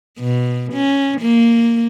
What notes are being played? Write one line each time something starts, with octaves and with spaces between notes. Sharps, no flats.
B2
C#4
A#3